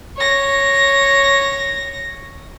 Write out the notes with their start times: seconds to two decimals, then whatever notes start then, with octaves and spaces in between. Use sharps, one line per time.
0.17 C#5 A#6